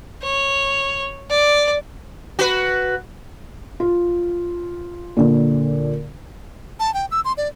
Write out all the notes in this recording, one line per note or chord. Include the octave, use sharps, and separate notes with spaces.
C#5
D5
F#4 B4
F4
A#2 D3
A5
G5
E6
C6
D5